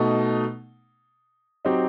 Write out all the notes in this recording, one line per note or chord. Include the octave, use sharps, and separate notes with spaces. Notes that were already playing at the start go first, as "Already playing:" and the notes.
Already playing: B2 A3 D#4
F#3 C4 D#4 G4